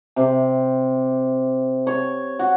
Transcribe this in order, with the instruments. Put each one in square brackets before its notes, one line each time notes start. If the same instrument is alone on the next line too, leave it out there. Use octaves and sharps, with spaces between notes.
[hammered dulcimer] C3
C#5
F#4